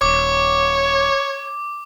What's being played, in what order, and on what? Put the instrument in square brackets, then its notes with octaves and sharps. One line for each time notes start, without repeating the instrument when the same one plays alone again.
[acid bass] D#1 [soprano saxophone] C#5 [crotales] D6